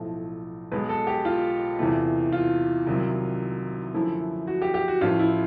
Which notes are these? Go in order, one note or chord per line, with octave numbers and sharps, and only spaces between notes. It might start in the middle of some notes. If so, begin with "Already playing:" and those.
Already playing: B1 A2 F3 A3
B1 B2 G#3 B4
A4
G4
F4
E2 C3 E3 A3
F4
C2 C3 D#3 F#3
F#2 D3 F3 A3 E4
F#4
G4
G4
F#4
A1 A2 F3 F4
E4